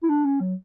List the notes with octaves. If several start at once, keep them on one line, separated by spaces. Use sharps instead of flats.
E4
D4
C#4
F#3